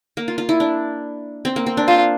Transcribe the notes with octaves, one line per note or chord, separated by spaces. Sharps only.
A#3
F4
F4
E4
D4
C4
A#3
C4
D4
F4 C5